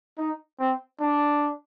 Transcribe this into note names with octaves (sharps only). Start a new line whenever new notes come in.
D#4
C4
D4